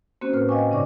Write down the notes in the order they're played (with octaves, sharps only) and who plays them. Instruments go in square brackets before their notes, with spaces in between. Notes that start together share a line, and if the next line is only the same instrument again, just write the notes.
[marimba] A#3 C4 C#4 F#4 C5
A2 A#3 A#4 B4 F6
D#5 F5 G5 G#5 C#6 D6
G2 C#3 D#4 D5 C#6 D6